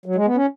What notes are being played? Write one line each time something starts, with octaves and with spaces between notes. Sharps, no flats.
F#3
G#3
B3
C#4